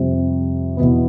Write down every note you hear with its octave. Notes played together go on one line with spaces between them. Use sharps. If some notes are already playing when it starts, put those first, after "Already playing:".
Already playing: F2 C3 G3
E2 B2 B3